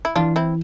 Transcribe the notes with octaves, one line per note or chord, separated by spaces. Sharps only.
E4
E3 D4 F4
C4 E4